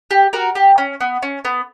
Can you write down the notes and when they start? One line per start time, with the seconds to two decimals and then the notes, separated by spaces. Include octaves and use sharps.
0.11 G4
0.33 F#4 A#4
0.55 G4
0.78 C#4
1.00 B3
1.22 C#4
1.45 B3